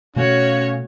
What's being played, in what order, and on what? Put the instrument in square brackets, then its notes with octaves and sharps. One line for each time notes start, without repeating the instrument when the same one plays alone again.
[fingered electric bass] B2 A3 [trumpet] C#4 [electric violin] F#4 C#5 [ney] F5